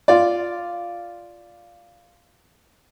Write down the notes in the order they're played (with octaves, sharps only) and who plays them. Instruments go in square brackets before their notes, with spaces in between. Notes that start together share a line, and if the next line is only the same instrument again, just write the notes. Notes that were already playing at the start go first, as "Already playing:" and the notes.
[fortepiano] F4 D5